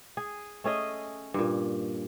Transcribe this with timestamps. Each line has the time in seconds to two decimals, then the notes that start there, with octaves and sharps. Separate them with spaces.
0.17 G#4
0.64 A3 C#4 G#4 D#5
1.34 G2 A#2